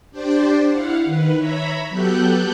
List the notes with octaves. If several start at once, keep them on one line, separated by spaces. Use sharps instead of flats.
D4 G4 C5 D5
E4 F5 F#5
D#3 B4
C#5 E5 A#5 B5
F#3 B3 G4 A4 F#6 G6